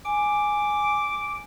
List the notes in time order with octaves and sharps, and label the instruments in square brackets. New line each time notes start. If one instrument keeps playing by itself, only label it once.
[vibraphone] G#5 [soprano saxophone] D6